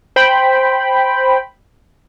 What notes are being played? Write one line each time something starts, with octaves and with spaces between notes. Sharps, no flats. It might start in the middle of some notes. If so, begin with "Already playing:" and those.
C5 G5 B5